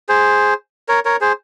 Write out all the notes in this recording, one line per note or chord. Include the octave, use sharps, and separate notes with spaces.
G#4 C5
A#4 C#5
A#4 C#5
G#4 C5